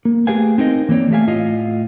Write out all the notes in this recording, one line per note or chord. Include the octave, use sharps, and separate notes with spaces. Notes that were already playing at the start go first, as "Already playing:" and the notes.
A#3
A3 G4 G#4 B4 F5 G#5
C4 D#4 A#4 D#5
E3 A#3 C4 C#5 D5
A3 G4 E5 F5 G#5
A2 F4 D#5 F5